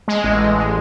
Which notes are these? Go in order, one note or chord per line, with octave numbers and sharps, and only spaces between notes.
G#3
A1
A1
G#3